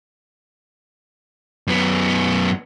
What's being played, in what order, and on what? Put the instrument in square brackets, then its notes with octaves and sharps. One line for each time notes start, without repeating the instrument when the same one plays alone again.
[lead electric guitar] F#2 B3